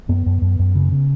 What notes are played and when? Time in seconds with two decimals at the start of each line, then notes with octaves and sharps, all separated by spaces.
0.09 F#2 B3
0.26 F#2
0.42 F#2
0.59 F#2
0.75 C#3
0.92 C#3